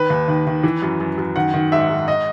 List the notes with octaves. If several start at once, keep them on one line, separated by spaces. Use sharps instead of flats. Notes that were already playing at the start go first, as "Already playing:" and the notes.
Already playing: D#3 B4
D#2
D#3
D#3
E3
F#2
F#2
F#2
D#3 F#5
D#3
G#2 E5
G#2
D#5